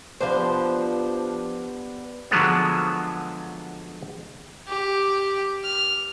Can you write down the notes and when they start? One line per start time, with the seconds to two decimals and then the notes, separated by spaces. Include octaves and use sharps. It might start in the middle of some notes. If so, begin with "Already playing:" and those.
0.21 F3 B3 D4 G4 C5
2.31 D3 F3 F#3 G#3 B3
4.68 G4
5.63 F6